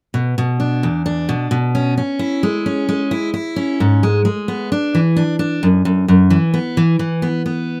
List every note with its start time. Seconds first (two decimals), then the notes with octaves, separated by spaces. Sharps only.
0.14 B2
0.38 B2
0.60 D4
0.83 E2
1.06 D4
1.29 B2
1.51 B2
1.75 C#4
1.97 C#4
2.19 E4
2.43 G#3
2.66 C#4
2.89 G#3
3.11 E4
3.34 E4
3.56 C#4
3.80 G#2
4.03 G#3
4.25 G#3
4.48 B3
4.72 D4
4.95 E3
5.16 D4
5.39 D4
5.63 F#2
5.85 F#2
6.08 F#2
6.30 E3
6.54 B3
6.77 E3
6.99 E3
7.22 B3
7.46 B3